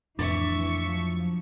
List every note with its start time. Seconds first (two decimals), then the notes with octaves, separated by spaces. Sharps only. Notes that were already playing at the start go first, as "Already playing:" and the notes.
0.19 F2 A2 C3 E3 D4 E5 C#6
0.81 F3 F#3